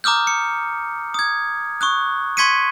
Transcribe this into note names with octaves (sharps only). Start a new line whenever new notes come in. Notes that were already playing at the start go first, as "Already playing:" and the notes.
A#5 D6 D#6 F6 G6
C#7
D#6 G#6
C#6 D#6 F#6
C6 C#6 G#6 B6 C#7 D#7